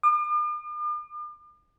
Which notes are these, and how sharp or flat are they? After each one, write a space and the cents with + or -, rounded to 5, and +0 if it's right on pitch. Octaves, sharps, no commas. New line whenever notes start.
D6 +45